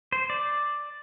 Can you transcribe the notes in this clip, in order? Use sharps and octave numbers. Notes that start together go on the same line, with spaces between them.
C5
D5